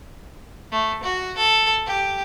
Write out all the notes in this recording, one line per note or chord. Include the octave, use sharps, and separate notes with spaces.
A3
F#4
A4
G4